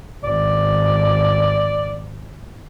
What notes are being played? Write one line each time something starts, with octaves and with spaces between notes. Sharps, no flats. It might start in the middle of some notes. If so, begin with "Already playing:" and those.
G#1 D5